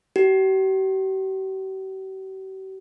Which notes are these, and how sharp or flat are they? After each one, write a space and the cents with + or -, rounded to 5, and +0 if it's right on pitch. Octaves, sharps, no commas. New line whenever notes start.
G4 -45